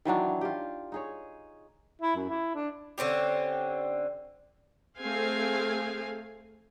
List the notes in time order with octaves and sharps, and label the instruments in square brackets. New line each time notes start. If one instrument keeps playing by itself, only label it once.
[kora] D#3 E3 F#3 D4
F4 G4
D#4 G#4 C#5
[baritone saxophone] E4
F#2
E4
D4
[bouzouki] D3 C4 C#4 G4
[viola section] A3 C4 G#4 F5 G#5